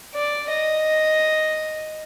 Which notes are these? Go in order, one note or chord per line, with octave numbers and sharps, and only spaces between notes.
D5
D#5